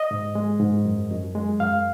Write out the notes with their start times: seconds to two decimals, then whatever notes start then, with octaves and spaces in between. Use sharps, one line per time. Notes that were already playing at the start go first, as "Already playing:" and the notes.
Already playing: D#5
0.11 G#2
0.35 G#3
0.60 G#2
0.85 F#2
1.10 F#2
1.35 G#3
1.60 F#2 F5